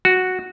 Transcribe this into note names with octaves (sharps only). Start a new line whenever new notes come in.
F#4